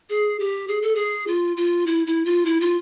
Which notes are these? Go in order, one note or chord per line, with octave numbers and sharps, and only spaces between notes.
G#4
G4
G#4
A4
G#4
F4
F4
E4
E4
F4
E4
F4